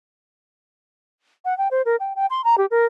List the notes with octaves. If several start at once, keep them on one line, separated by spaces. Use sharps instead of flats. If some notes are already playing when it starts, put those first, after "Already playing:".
F#5
G5
C5
A#4
G5
G5
C6
A#5
G4
A#4